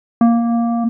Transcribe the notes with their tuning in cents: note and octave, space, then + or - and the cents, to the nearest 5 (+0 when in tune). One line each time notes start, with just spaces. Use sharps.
A#3 +5